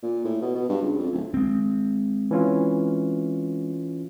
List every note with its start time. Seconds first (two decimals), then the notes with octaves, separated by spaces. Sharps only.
0.03 A#2
0.24 A2
0.42 B2
0.55 B2
0.69 G2
0.82 C#2
0.99 F2
1.12 D1
1.34 G#3 C4
2.31 E3 C#4 F4